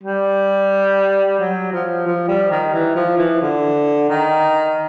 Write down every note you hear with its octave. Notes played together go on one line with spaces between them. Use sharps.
G3
F#3
F3
F3
G3
D#3
E3
F3
E3
D3
D#3